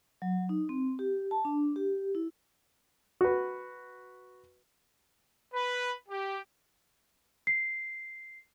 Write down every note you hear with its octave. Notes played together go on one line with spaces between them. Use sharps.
F#3
D#4
C4
G4
A5
D4
G4
E4
F#4 B4
B4
G4
C7